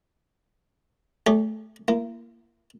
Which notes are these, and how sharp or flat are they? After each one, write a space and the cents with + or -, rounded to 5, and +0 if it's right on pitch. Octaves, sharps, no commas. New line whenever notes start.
A3 -15 G4 +45 C#5 +45
A#3 +0 E4 +45